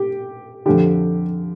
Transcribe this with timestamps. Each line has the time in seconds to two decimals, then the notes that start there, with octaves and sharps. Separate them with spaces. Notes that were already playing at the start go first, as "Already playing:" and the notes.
Already playing: G4
0.66 D3 G4
0.69 F2